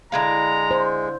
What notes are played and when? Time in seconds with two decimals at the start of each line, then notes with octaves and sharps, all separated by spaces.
0.12 D3 G#3 E4 F5 A#5
0.71 C5